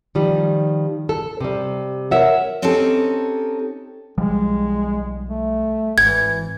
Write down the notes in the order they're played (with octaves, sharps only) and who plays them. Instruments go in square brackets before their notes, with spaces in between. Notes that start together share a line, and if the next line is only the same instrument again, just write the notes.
[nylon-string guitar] D#3 F3 G3
A4
C3 G3
A#4 C#5 E5 F#5
[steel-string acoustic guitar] C4 C#4 D#4 G4 A4
[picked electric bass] B1 F3 G3 [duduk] G#3
[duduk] A3
[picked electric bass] G#1 [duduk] E3 [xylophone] G#6